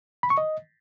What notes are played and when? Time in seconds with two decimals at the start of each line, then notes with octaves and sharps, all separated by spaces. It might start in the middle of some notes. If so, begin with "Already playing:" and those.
0.23 B5
0.30 C#6
0.38 D#5